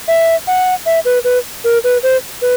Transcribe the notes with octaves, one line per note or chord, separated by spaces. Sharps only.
E5
F#5
E5
B4
B4
A#4
B4
C5
B4